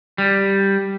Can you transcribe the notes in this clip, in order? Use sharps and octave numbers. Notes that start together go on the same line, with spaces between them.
G3